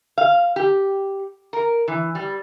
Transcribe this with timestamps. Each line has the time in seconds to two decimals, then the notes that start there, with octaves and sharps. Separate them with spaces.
0.18 F5
0.56 G4
1.53 A#4
1.88 E3
2.15 G3